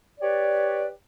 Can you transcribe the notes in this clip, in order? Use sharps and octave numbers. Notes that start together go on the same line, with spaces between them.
G4 B4 C#5 D5